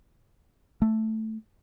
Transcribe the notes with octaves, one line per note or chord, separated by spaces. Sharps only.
A3